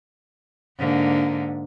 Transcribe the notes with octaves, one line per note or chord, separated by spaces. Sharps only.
G#2 D3 A#3